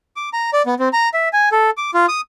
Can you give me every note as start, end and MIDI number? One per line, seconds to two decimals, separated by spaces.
0.16 0.29 86
0.33 0.50 82
0.53 0.62 74
0.66 0.74 59
0.79 0.89 60
0.93 1.09 82
1.14 1.29 76
1.33 1.49 80
1.52 1.70 69
1.77 1.91 86
1.94 2.06 65
2.08 2.21 87